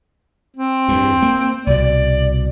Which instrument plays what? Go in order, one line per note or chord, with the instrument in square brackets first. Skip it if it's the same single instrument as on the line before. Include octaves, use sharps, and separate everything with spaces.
[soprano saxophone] C4
[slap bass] E2 G2
A#3
[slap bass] C2 B2 [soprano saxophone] D5